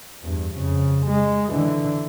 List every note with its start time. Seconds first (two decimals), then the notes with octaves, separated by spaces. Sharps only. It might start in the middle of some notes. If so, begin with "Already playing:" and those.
0.22 E2 G2
0.55 F2 C#3
1.07 G#3
1.53 D3 E3